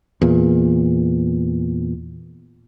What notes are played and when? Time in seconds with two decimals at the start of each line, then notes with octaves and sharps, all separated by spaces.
0.22 E2 A#2